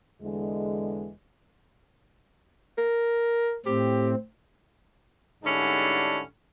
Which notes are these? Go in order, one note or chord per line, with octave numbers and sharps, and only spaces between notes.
E2 D3 G#3
A#4
A2 C4 G4
G#2 D3 G3 C#4 D4 E4